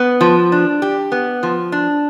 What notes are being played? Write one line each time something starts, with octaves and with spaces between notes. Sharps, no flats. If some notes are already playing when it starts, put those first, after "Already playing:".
Already playing: B3
F3
D4
G4
B3
F3
D4